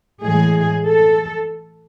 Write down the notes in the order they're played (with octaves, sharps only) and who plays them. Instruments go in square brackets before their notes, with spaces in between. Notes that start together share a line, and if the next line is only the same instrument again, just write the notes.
[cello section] A2 E3 G#3 G#4
A4